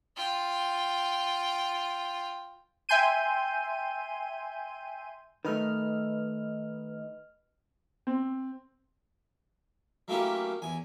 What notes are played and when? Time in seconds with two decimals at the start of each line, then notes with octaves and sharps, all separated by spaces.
0.16 F4 G5
2.89 E5 G5 G#5 C6 G6 D#7
5.45 D#3 A3 B4 D#5 F6
8.07 C4
10.08 F#3 A3 A#3 C#4 E4 G4
10.62 E2 G#5